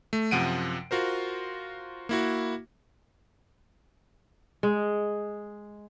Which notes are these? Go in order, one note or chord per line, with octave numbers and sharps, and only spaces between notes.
A3
F#2 C3 F3 F#5 D7 D#7
F4 F#4 A#4 C5
A#3 E4 F#4
G#3